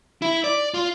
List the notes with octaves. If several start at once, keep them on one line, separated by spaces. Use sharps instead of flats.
E4
D5
F4